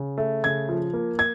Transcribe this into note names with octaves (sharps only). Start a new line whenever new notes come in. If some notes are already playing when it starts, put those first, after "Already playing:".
Already playing: C#3
A3
C#3 G#6
F3
A#3
G#6